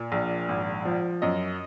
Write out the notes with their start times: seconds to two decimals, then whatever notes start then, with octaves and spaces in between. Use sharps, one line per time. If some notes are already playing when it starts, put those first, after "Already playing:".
Already playing: A#2
0.12 A#1
0.49 G#1
0.85 F3
1.22 F#2 D#5